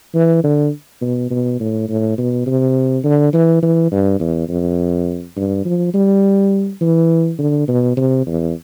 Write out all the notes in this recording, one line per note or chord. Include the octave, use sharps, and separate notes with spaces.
E3
D3
B2
B2
A2
A2
B2
C3
D3
E3
E3
G2
E2
F2
G2
F3
G3
E3
D3
B2
C3
E2